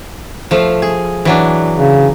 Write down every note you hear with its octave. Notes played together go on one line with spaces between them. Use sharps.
F3 A3 F5
G#4
E3 F#3 D4
C#3